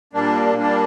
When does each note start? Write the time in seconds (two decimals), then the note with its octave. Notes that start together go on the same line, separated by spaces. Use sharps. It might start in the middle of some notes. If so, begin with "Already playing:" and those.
0.13 A#2 G3 A#3 D4
0.55 A#2 G3 A#3 D4